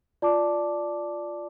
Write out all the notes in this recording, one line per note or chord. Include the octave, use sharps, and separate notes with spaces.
F4 D5 A5 D6